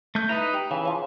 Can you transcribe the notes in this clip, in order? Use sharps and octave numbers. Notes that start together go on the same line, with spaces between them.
A3 G6
D#4 E4 B4 A#5
G4
C#3 E3
C#3 F3